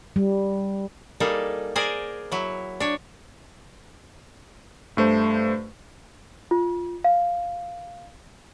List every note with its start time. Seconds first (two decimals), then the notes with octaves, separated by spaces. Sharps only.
0.16 G3
1.20 G3 A#3 D#4 G#4 A4
1.76 G#4 A#4 C5 D5 G#5
2.32 F#3 E4
2.80 D4 C#5
4.97 G2 A3 C5
6.51 F4
7.04 F5